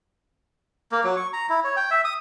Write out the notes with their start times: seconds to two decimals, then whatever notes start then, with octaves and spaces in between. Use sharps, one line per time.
0.92 A#3
1.04 F#3
1.17 C#6
1.33 A#5
1.49 E4
1.64 C#5
1.77 G5
1.91 E5
2.05 D#6